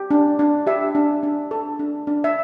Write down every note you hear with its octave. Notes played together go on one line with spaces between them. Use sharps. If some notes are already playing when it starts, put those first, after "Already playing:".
Already playing: G4
D4
D4
G4 E5
D4
D4
A4
D4
D4
E5